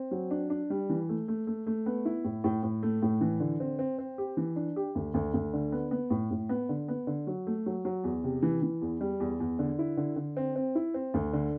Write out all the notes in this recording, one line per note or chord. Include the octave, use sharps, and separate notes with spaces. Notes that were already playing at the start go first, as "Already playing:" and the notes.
Already playing: C4
F#3
D4
D4
G3
E3
A3
A3
A3
A3
B3
E4
A2
A2
A2
A3
A2
E3
D3
C4
C4
C4
G4
E3
D4
G4
D2
D2
D2
D3
B3
B3
A2
A2
B3
D3
B3
D3
F#3
A3
F#3
F#3
E2
C3
E3
E3
E2
G3
E2
E2
D3
E4
D3
D3
C4
C4
E4
C4
D2
D3